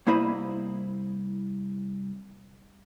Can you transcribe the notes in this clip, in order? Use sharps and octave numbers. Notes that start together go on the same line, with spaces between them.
C2 A#3 E4 C5 D#5 B5